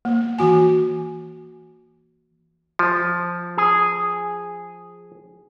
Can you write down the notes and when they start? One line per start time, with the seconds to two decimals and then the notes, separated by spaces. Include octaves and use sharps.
0.05 A#3
0.38 E3 F#4 G#5
2.79 F3
3.58 G#4